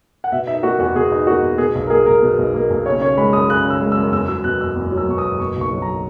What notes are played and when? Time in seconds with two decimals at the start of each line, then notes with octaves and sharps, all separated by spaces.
0.24 F#5
0.32 B2 E5
0.47 D#4 E5
0.63 A#3 F#4
0.79 E2 F#4
0.95 B2 G#4
1.12 D#4
1.27 A#3 F#4
1.42 E2
1.58 B2 G#4
1.75 B1
1.87 A#4
1.90 A#3 G#4
2.06 B1 A#4
2.22 B2
2.38 B1
2.54 A#3
2.70 B1
2.86 C#3 C#5
3.01 C#4 C#5
3.18 G#3 B5
3.33 F#2 D#6
3.50 C#3 F#6
3.65 C#4
3.70 E6
3.81 G#3
3.92 E6
3.98 F#2
4.13 E2 E6
4.28 F#3 E6
4.44 B2 F#6
4.61 F#1 E6
4.76 E2
4.92 F#3
4.97 E6
5.08 B2 C#6
5.18 D#6
5.25 F#1
5.39 B2 C#6
5.56 B1
5.61 C#6
5.72 F#3
5.82 A#5